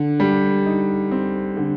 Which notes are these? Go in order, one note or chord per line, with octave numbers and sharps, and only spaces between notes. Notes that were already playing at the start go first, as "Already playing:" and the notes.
Already playing: D3
G3
D#4
C4
D3